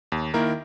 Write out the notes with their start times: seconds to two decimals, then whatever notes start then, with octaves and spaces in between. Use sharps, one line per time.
0.12 D#2
0.34 D#3 A#3 E4 A#4